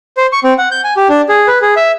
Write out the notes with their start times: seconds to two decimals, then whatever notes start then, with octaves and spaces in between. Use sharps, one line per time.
0.17 C5
0.32 C#6
0.44 C4
0.58 F#5
0.71 G6
0.84 G#5
0.97 G4
1.09 D4
1.29 G#4
1.47 B4
1.62 G#4
1.76 E5